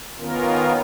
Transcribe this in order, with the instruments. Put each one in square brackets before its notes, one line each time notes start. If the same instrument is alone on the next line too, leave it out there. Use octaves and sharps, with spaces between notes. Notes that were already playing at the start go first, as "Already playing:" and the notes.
[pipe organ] D#3 B3 C#4 F4 A#4